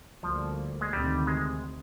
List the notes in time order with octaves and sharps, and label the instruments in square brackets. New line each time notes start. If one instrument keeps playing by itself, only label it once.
[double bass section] D2 D3 G3 A#3 [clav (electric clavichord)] F3
[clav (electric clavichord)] G#3
[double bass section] D2 C3 D#3 [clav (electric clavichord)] G3
[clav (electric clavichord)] G#3